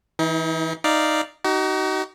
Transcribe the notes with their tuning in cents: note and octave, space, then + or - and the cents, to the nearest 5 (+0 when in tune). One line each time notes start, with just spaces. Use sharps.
E3 -20 D#4 +40
D#4 +0 D5 +0 F5 -10
D#4 +0 F#4 +40